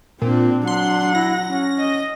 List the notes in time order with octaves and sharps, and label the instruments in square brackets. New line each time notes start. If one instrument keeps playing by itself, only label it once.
[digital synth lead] A#2 [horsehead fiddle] C4 [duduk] D4
[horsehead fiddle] F#3 F#5 [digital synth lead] C6
[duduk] E4 [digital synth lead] A#6
[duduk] C#4
[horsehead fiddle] D#5